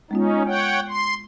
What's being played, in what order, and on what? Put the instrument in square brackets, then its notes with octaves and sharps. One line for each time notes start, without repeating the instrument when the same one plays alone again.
[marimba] G#3 B3 F4 [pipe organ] C#4 D#4
[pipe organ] C#5 F#5 G5
C6